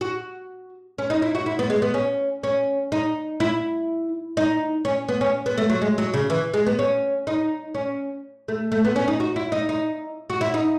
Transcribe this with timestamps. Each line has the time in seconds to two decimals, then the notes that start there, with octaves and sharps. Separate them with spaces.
0.01 F#4
0.98 C#4
1.10 D#4
1.22 E4
1.35 F#4
1.46 E4
1.59 B3
1.70 G#3
1.82 B3
1.94 C#4
2.43 C#4
2.92 D#4
3.40 E4
4.37 D#4
4.85 C#4
5.09 B3
5.21 C#4
5.46 B3
5.58 A3
5.70 F#3
5.82 G#3
5.98 F#3
6.14 C#3
6.30 E3
6.54 G#3
6.66 B3
6.79 C#4
7.27 D#4
7.75 C#4
8.48 A3
8.72 A3
8.85 B3
8.96 C#4
9.08 D#4
9.20 F#4
9.36 E4
9.52 D#4
9.69 D#4
10.30 F#4
10.41 E4
10.54 D#4